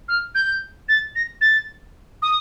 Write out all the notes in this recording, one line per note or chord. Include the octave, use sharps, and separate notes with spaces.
F6
G6
A6
A#6
A6
D#6